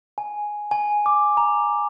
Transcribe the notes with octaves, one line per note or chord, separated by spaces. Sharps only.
G#5
G#5
D6
A#5